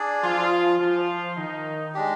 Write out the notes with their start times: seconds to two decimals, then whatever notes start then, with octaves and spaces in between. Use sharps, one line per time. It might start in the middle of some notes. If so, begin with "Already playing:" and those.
Already playing: D4 G#4 D5
0.23 F3 F4
0.80 F3 F4
1.37 D#3 D#4
1.95 G#3 D4 G4